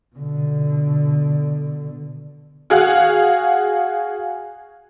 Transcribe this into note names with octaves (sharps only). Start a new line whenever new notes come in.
B2 D3
F#4 G#4 F5 F#5 F#6